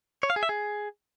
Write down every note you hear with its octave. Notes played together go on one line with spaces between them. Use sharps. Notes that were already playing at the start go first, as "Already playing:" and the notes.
C#5
F5
G#4
E5
G#4